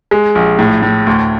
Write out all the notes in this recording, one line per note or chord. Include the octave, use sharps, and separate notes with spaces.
G#3
A#1
A2
A2
D2